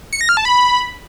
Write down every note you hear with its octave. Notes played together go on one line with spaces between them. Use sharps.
C#7
A#6
F6
A5
B5